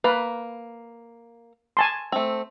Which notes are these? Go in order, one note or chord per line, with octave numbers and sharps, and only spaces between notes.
A#3 B4
G#5 A5 C6
A3 C4